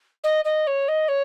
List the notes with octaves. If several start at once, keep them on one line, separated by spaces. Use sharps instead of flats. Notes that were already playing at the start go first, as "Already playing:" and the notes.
D#5
D#5
C#5
D#5
C#5